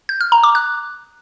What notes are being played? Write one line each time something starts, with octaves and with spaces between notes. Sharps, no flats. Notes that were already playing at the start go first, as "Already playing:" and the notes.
G6
F6
A#5
D6
F#6